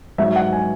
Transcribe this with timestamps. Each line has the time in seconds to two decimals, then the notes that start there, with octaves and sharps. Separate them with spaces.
0.18 G#2 F#3 E5
0.36 F#5
0.52 G#5